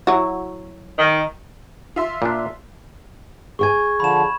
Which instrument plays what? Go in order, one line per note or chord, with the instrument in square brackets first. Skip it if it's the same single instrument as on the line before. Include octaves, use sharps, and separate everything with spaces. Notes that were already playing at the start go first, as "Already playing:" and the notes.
[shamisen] F#3 E4 F#4
[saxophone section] D#3
[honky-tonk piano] F4 E5 C6
[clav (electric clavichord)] A#2 D4
[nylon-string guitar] G#4 G5 G#5 [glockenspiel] C#6 G#6
[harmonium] D3 F3 [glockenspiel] B5 E7